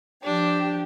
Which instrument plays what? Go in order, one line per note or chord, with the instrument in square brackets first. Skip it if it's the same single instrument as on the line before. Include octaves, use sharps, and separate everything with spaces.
[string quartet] F3 G4 [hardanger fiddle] D4